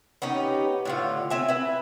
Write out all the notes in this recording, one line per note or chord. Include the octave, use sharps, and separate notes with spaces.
B3 C#4 D#4 G4
A2 D3 F4
C4 E5 G#5
E4 B4